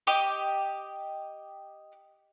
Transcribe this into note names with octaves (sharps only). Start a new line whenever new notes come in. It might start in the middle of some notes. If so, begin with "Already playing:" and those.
G4 D#5 D6